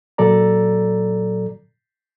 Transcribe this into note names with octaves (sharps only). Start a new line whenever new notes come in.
A#2 F#3 A4 D5 A#5